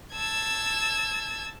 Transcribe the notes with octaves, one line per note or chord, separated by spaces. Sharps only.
A5 E6 G#6